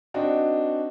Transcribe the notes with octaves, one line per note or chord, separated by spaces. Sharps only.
C4 D4 D#4 F#4